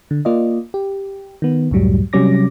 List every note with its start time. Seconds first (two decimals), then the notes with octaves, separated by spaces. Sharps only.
0.11 D3
0.25 A#3 F4 D5 D#5
0.74 G4
1.42 D#3 B3
1.71 C#2 F#2 A2 F#3 G3
2.13 C3 F#3 G3 C#4 D6 A#6